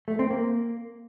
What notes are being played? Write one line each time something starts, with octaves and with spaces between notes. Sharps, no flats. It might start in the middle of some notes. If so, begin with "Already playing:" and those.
A3
C4
A#3